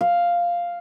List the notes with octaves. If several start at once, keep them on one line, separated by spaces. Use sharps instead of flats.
F5